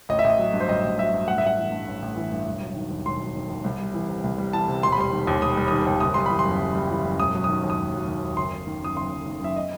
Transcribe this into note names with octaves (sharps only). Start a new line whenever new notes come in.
A1 D#5
E5
A1
D#5
F#3
G2
C5
A1 D#5
A1
F#3 E5
G2
A1 F#5
E5
A1 F#5
E3
G2
A1
A1
E3
G2
E1
F#3
D#3
D#2
E1 C6
F#3
D#3
D#2
C2
G3
E3
C3
C2
G3
E3 A5
C3
E1 C6
B5
G3 C6
D#3
D#2
E1 D#6
G3
D#3 D#6
D#2
F#1 D#6
G3 C6
E3 B5
C6
F#2
F#1
G3
E3
F#2
E1 D#6
F#3
D#3 D#6
D#2
D#6
E1
F#3
D#3
D#2
F#1 C6
F#1
D#3
F#2 D#6
F#1 C6
F#1
D#3
F#2 E5
D#5